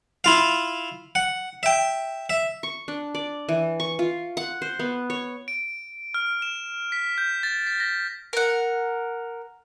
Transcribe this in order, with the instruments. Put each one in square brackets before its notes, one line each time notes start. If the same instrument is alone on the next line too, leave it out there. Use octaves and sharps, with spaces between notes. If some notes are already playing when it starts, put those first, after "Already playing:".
[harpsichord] E4 F4 F5
F#5
E5 G5
E5
[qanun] C#6
D4
D5
E3
C#6
F4
F#5
C5
B3
C#5
[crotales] D7
F6
E7
B6
G6
A6
B6
A#6
[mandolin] A#4 F#5